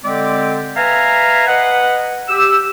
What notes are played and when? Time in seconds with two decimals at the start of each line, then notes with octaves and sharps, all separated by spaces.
0.04 D3 G#3 C4 G4 D5
0.77 B4 E5 F5 G#5 A#5
1.47 B4 D#5 F#5
2.29 G4 E6